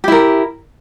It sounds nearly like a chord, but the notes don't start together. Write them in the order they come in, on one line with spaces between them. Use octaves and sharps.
G4 E4 A#4